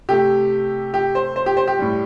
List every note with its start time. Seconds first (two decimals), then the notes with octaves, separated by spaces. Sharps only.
0.09 C3 A3 G4
0.94 G4
1.15 C5
1.36 C5
1.46 G4
1.57 C5
1.67 G4
1.79 A2 G3